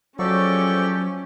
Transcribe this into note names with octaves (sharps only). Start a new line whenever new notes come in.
G#2 F3 F#3 C#4 G4 A4 D5 C#6